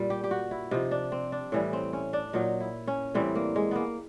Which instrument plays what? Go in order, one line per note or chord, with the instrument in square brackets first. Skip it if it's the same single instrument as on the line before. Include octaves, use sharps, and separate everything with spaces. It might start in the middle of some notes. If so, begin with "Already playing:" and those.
Already playing: [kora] A#2 G3
G4
G4
F#4
E4
C3 F3 D#4
D4
C4
D4
A2 E3 G3 C#4
C4
C#4
D4
A#2 F#3 D#4
E4
C#4
A2 E3 G3 C4
A#3
G#3
A#3 B3